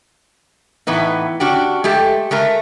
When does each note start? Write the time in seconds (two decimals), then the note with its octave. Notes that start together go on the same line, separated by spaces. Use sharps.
0.87 A2 E3 B3 D#4
1.40 C#4 D4 F#4 G4
1.84 G#3 A3 G4 A4
2.31 G#3 A3 A#4